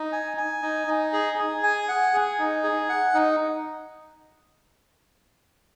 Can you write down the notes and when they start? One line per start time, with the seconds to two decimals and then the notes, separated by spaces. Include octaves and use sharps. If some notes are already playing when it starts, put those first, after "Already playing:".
Already playing: D#4
0.12 G#5
0.37 G#5
0.62 D#4
0.87 D#4
1.13 G#4
1.38 G#4
1.63 G#5
1.88 F#5
2.14 G#4
2.39 D#4
2.64 G#4
2.89 F#5
3.15 D#4